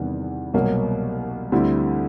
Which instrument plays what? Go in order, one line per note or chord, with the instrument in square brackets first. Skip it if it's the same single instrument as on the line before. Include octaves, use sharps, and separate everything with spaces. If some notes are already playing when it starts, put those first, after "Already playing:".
Already playing: [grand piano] E2 C3 D#3 G3 B3
C2 B2 F#3 A#3
D2 D3 G3 C4 E4